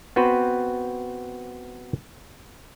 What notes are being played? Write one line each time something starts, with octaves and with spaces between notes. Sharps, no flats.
B3 C4 F#4 B4 C5